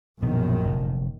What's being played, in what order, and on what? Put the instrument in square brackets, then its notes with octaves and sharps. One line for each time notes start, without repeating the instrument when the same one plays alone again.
[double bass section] A#1 F#2 D#3 [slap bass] B2 F3 B3
[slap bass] F1